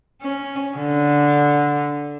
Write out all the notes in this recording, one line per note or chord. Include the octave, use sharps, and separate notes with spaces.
C#4
D3